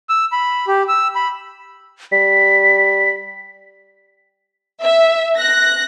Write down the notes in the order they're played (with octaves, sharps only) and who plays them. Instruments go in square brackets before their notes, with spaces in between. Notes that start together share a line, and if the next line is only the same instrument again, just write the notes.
[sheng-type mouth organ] E6
B5
G4
E6
B5
[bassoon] G3 [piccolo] B6
[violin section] E5
F#6 A#6